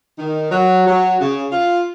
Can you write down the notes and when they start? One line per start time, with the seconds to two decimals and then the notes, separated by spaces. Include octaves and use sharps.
0.18 D#3
0.51 F#3
0.87 F#3
1.20 C#3
1.52 F4